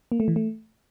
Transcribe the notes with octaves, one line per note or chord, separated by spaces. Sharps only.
A#3
A3
E3
A3